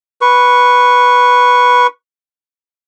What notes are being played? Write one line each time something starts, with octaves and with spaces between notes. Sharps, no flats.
B4 C#6